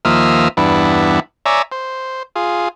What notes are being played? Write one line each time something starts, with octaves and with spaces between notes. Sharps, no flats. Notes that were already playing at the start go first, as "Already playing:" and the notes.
D#2 F3 A#3 E5 D#6 F6
E2 G2 B3 D4 E4
C#5 D5 E5 G#5 A#5
C5
F4 G#4